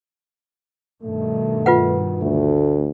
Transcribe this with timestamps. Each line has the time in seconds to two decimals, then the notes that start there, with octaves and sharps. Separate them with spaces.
1.03 G2 B2 D#3 A3
1.66 F4 B4 F#5
2.21 D2 A3